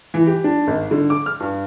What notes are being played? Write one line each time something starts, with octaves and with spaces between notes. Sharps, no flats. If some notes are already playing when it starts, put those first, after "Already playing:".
E3
G4
D4
G#1
D3
D6
F6
G2